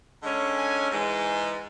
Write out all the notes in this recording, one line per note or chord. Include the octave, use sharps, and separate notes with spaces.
D3 G#3 C#4
G#5
G#2 E3 G#3